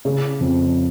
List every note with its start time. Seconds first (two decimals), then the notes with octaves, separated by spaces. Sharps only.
0.05 C#3
0.40 F2